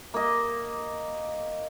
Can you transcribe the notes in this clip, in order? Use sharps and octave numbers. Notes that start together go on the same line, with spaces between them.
A#3 D#5